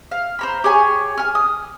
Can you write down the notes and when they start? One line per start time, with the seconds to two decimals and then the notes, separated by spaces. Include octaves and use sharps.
0.11 F5
0.39 C5 A#5 B5
0.64 G4 G#4 C#5 G#5
1.17 G#5 F6
1.35 D#6